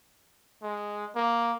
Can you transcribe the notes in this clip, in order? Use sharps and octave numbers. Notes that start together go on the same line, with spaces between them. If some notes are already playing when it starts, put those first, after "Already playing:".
G#3
A#3